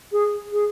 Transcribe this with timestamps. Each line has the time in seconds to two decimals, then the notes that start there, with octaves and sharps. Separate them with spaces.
0.12 G#4
0.52 G#4